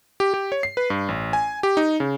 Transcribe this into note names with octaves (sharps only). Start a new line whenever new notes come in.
G4
G4
C#5
C7
B4
G2
A1
G#5
G4
D#4
C#3